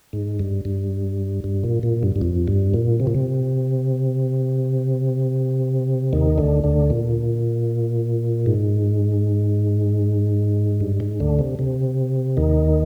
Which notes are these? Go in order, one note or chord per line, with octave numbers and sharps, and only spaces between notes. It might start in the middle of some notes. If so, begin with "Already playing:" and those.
G#2
G2
G2
G2
A#2
A#2
G2
G2
F2
G2
A#2
C3
A#2
C3
D#2 D#3
D2 D3
D2 D3
A#2
G#2
G2
G#2
D2 D3
C3
C3
D#2 D#3